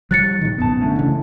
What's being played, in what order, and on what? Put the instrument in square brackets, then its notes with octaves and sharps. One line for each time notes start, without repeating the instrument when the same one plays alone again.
[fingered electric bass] F3 G3 [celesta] F#6 A6 C#7
[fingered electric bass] A#2 D#3
[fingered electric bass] A1 F#2 B2 [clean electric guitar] B3 A5
[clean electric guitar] D3 A3 C#4
[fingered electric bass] C#3 E3